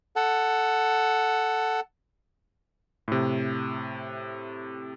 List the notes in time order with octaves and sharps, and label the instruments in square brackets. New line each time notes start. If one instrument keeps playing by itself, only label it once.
[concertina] A4 F#5
[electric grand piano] A2 C3